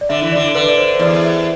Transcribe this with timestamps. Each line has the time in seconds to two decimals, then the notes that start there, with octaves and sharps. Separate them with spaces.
0.01 D5
0.09 D3 E5
0.22 E3
0.32 D3 D5
0.54 D3 B4
0.68 D5
0.78 C5
1.00 E2 D5
1.22 E5